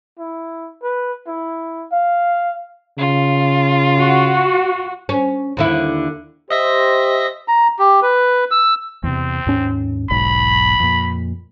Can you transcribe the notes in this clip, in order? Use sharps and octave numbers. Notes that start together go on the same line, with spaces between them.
E4
B4
E4
F5
C#3 F4
F#4
C#4
D#2 D3 E4
G4 C5 D#5 E5 A#6
A#5
G4
B4
E6
E2 C3 C4
D#2 G#2 C#4
E1 B1 G#2 B5
F2 A#2